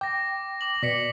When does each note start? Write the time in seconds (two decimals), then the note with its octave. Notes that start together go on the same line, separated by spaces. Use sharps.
0.01 G5 D6 A#6
0.61 D6 F#7
0.83 B2 D5 D6 B6 C#7